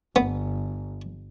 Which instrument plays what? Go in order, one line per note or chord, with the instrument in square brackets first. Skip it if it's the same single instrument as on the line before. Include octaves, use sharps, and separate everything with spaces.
[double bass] G1 [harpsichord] B3